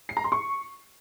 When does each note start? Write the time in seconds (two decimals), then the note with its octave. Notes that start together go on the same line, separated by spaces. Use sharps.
0.09 C7
0.17 A#5
0.24 C6
0.32 C#6